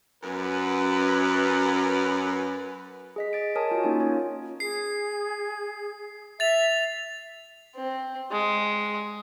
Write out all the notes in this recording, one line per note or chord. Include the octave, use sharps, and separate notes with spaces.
F#2 B4
G#4 D#5 B6
D#5 A6 D7
A#4 C#5 G#5 A5 D#6
F4 F#4
A#3 C#4 D#4 F4 G#5
F4 C#5
G#4 C7
E5 A6 F7
C4
G#3